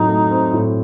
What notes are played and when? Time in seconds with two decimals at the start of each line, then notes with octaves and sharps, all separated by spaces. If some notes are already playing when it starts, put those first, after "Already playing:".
Already playing: A2 F#3 C4 D#4
0.08 A3
0.31 C4
0.53 A2